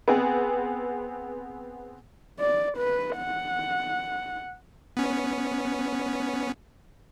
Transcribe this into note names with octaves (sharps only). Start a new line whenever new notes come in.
B3 C4 G#4
D5
B4
F#5
B3 C#4